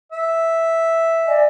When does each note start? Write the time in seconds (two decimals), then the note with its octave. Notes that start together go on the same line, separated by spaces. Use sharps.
0.12 E5
1.25 D5 D#5 G#5